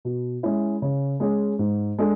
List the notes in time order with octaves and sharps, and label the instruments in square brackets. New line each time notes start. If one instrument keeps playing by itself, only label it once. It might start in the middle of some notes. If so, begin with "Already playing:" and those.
[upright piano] B2
G#3 C#4 E4
C#3
G#3 C#4 G#4
G#2
G#3 D4 A4